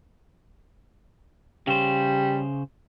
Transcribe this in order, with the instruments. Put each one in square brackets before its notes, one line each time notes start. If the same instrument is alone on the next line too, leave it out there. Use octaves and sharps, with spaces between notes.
[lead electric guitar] C#3 C5 [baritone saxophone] G3